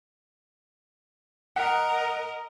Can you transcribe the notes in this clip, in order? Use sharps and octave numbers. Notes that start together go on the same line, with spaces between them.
A#4 D#5 F#5